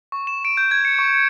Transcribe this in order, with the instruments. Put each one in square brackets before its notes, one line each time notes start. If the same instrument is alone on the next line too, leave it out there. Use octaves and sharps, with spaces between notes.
[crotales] C#6
E7
D7
G6
G#6
C#7
C#6
C#7